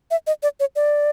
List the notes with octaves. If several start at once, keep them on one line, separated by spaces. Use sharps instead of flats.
E5
D#5
D5
C#5
D5